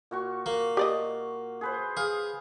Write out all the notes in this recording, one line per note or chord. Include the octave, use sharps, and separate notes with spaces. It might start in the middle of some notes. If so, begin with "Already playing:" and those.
A#2 F#4 C#6
A#3
G4 D5 D#5
G#4 B4 C5
G#4 F5